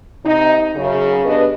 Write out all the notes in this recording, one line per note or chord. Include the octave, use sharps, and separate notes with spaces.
C3 D#4
F#2 C#3
B3 D4 G4 B4 D#5